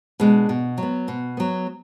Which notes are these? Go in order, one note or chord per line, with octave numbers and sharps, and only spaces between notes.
B2 G#3 D4
B2
F#3
B3
B2
F#3 B3